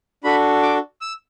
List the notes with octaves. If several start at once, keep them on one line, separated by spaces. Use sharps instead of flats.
D4 F#4 A4 B5
D6
E6